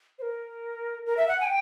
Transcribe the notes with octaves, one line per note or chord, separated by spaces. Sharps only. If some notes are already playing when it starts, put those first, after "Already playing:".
C5
A#4
A#4
E5
F#5
G#5
G5